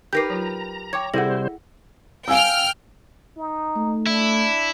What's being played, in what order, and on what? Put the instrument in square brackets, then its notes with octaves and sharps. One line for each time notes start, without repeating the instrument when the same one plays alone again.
[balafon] D#4 D6 [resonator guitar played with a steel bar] G4 A#4 B4 [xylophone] G6 A#6 C7
[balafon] F#3 F4 [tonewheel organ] A#5
[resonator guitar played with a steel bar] C#5 [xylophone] G5 D6 G#6
[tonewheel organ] C3 G3 C5 [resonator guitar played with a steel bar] E4 [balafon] G#4 A4 [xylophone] F#5 A#6
[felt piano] F5 G#5 E6 [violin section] G5 F6
[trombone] D#4
[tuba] A3
[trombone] D4 [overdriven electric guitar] E4